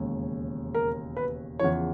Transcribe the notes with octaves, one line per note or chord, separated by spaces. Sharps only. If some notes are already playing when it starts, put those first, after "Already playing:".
Already playing: E1 D#2 C#3
A#4
B4
E2 C#3 F3 C#5